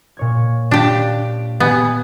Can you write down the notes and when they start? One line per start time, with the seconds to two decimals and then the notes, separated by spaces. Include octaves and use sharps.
0.17 A#2 C#5 G#6
0.71 D4 F4 G4 F#6
1.60 B3 G4 G#5